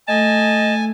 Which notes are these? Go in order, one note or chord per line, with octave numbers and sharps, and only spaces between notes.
A3 D#5 G#5 A5